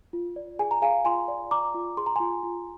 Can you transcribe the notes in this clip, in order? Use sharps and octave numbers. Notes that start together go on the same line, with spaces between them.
F4
D5
G#4 G#5
A#5
G#4 F5 G#5
F4 G#5 C6
D5
D5 A#5 D6
F4
G#4 C6
A#5
F4 G#5 C6
F4